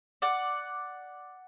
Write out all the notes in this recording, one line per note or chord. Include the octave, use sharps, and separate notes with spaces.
D5 F#5